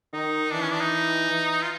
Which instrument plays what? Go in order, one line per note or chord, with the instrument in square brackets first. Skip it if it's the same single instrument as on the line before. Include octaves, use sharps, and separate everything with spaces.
[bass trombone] D#3 [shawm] D#4
[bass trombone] E3 [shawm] D4
[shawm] C#4
D4
D#4
[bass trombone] E3
[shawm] F4